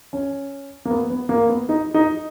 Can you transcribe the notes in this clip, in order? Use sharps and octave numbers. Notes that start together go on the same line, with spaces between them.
C#4
A#3
B3
B3
A#3
B3
D#4
D#4